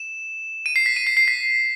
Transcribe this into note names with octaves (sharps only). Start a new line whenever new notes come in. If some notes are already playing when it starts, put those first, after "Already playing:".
Already playing: E7
D#7
C7
B6
D#7
C7
C7
B6